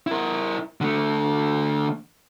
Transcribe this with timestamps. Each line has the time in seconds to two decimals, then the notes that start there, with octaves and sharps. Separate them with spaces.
0.07 E4 A#4
0.81 D3 A3